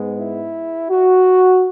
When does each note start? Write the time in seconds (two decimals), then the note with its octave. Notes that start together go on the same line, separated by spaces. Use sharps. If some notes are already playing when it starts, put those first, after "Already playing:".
Already playing: G#2 G#3 B3
0.18 E4
0.91 F#4